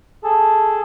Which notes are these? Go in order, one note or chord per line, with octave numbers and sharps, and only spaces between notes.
G#4 A4 A5